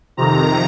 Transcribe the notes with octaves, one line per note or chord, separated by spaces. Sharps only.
F2 C3 D#3 A#5